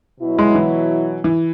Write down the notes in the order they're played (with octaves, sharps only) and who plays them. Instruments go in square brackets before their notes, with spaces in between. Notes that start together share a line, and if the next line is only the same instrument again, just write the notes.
[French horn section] B2 F#3 E4
[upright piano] G#3
E3
E3